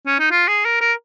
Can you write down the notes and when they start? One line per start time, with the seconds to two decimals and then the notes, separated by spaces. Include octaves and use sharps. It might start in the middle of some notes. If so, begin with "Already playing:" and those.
0.06 C#4
0.19 D#4
0.31 F4
0.48 G#4
0.65 A#4
0.81 A#4